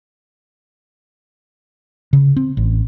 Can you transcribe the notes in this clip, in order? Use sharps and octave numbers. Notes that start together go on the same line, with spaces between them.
C#3
C4
A1